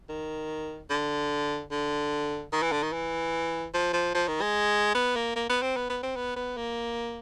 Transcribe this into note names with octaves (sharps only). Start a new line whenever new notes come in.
D#3
D3
D3
D#3
E3
D3
D#3
E3
F3
F3
F3
D#3
G#3
B3
A#3
A#3
B3
C4
B3
B3
C4
B3
B3
A#3